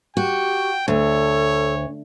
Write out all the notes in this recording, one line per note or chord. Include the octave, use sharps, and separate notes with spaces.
F#4 G4 G5
D2 A4 C#5